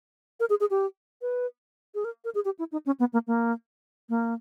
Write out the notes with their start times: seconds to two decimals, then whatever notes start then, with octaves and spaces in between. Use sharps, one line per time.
0.40 A#4
0.50 G#4
0.60 G#4
0.70 G4
1.22 B4
1.95 G#4
2.05 A#4
2.24 A#4
2.35 G#4
2.45 G4
2.59 E4
2.72 D#4
2.86 C#4
3.00 B3
3.13 A#3
3.27 A#3
4.09 A#3